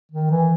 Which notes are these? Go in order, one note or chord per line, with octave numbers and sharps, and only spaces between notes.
D#3
E3